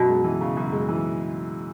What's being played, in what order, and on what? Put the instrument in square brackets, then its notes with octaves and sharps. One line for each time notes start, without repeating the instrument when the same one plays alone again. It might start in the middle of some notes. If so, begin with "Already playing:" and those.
Already playing: [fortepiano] F#2 [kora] B2
[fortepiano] G#3
E3
C#3
F#2
G#3
E3